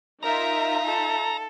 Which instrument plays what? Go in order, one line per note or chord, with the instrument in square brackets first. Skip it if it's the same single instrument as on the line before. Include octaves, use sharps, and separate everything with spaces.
[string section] D#4 F4 E5 [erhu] A#4 [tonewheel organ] A#5
[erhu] A4